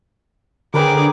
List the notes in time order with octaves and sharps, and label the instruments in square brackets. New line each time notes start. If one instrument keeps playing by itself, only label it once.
[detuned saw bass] D3 [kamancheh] G#4 D6 [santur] A#4 B4 G5